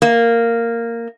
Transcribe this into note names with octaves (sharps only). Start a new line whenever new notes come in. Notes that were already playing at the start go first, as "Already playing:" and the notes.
A#3